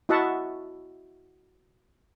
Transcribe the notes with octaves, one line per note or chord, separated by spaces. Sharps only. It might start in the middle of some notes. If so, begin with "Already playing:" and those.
E4 F#4 D#5 E5 F#5 A5